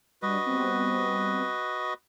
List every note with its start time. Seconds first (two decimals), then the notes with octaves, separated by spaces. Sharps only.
0.22 G3 D4 F#4 B4 D#5
0.46 G3 B3 C4